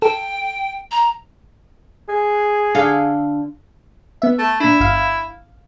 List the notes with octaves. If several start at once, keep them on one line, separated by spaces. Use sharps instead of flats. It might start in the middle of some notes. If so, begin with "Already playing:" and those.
A4 G5
A#5
G#4
D3 A4 F5
B3 E5
A3
A#2 D4 E4
G1 F5